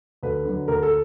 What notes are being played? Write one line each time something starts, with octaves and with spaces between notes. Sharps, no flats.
D2 B4
D3 F#3
D2 A#4
A4